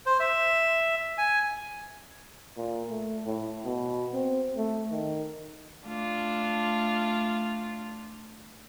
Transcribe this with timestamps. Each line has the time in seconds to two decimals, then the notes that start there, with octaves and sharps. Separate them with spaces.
0.06 C5
0.20 E5
1.18 G#5
2.57 A#2
2.90 A3
3.26 A2
3.65 B2
4.13 C4
4.57 A3
4.91 D#3
5.85 A3 D4 F4